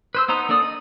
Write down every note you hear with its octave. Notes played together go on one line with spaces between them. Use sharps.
B4 C5 E6
B3 D#4 C5 A#5
A#3 D4 A4 D5 D#6
D#5